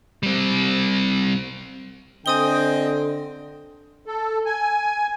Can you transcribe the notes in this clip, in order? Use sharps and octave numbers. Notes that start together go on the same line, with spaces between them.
G3 C4
D3 C4 D#5 G5 G#5 D#6 G7
A4
G#5